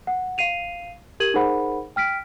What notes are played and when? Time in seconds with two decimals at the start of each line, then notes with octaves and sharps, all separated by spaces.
0.07 F#5
0.38 F5 C7 D#7 F7
1.20 G4 A#4 G#6 D#7 F#7
1.34 D#4 G#4 A#4 C5 F#5 B5
1.96 G5 F6 B6 D7